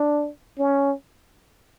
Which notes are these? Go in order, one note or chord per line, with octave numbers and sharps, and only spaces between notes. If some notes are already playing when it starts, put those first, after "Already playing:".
Already playing: D4
C#4